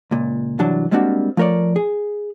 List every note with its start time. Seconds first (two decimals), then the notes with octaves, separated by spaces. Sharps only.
0.11 C#2 A#2
0.59 C2 G2 E3 F#3 D4 A5
0.91 G3 G#3 A#3 C4 D4 F#4
1.37 F3 A3 A#4 C#5 D5
1.76 G#4